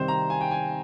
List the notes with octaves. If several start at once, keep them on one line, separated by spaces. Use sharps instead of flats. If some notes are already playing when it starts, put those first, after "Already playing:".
Already playing: C3 D#3 G3 C4 C5
A#5
G#5
G5
G#5